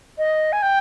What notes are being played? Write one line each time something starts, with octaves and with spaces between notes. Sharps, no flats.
D#5
G#5
G5